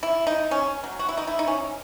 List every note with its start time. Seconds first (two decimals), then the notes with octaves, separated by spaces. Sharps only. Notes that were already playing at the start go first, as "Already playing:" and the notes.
0.03 E4
0.27 D#4
0.51 C#4
0.84 F#3
0.99 F#4
1.09 E4
1.17 D#4
1.27 E4
1.39 D#4
1.48 C#4